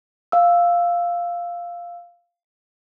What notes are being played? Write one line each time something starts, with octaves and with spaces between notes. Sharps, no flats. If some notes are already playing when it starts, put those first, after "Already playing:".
F5 E6